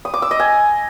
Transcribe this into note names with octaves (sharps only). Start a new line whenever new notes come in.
D#6
D6
E6
D#5
G#5